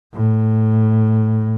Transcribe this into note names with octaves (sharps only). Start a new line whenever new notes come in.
A2